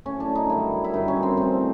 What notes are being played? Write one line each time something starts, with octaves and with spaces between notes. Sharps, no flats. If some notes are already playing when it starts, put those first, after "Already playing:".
A2 F#3 C#4
D4
D#4
G2 D#3 F#3 E4
E4
G2 D#3 F#3 D#4
C#4
C4
A2 F3 C4